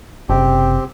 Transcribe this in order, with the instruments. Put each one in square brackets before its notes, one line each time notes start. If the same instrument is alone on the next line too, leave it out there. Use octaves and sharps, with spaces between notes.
[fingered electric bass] F#1 C3 [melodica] C4 G4